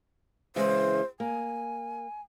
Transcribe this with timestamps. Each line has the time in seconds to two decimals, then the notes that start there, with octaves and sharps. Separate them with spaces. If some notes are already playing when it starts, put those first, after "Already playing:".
0.56 C#3 E3 G#3 C5
1.20 A#3 G#5